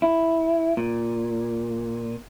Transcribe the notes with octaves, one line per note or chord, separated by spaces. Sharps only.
E4
A#2